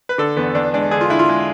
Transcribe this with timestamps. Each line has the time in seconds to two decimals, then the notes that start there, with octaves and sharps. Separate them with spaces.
0.09 B4
0.18 D3 A4
0.37 E2 B3
0.55 E2 D4
0.74 G#3 D4
0.91 D3 G#4
1.01 F4
1.10 D3 E4
1.19 F4
1.29 G#3